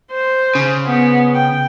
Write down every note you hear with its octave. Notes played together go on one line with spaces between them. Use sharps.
C5
C#3
B3
G5